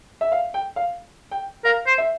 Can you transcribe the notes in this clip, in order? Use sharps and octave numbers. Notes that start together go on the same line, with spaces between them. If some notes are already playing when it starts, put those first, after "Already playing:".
E5
F5
G5
F5
G5
A#4 F5
C5
E5